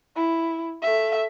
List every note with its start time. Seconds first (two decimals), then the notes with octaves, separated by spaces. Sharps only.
0.16 E4
0.82 A3 E5